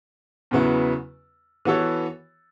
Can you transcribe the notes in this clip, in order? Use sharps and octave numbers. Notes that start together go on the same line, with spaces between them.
E2 C#3 F#3 B3 E4
E3 B3 F#4 A4 C#5